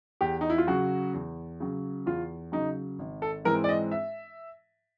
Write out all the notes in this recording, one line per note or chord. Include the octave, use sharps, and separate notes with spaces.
E2 G4
D#4
E4
F4
C#3 F#3 F#4
E2
C#3 F#3
E2 F4
C#3 F#3 D#4
G#1
A4
G#2 E3 G#3 C4 A#4
D5
D#5
E5